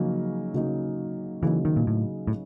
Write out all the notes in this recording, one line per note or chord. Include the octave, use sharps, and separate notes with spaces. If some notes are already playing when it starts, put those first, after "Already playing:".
Already playing: C#3 F3 F#3 A#3 D#4
C#3 F#3 A#3 D#4
C#3 E3 F#3 A#3 D#4
D#3
A#2
A2
A2